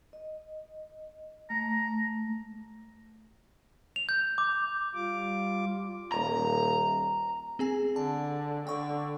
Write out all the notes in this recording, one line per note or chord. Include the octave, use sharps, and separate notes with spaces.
D#5
A3 A#5
F7
G6
D6
G3 F4 D6
D#1 A#5
C4 G#4 G#5
D3 A5
D3 G5 C#6